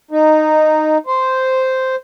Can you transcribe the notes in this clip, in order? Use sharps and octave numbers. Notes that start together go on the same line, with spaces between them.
D#4
C5